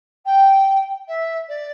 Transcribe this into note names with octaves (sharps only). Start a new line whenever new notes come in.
G5
E5
D5